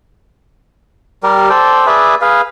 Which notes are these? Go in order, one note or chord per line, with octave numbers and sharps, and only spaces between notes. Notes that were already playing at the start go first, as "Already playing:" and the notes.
G3 G4 A#4
A4 C5 D5 G5
G#4 B4 D5 E5
G#4 B4 F5